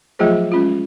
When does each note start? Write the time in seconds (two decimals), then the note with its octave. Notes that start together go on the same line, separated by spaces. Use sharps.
0.19 F3 F#3 A3 F4 G#4 C5
0.52 G#3 C#4 F4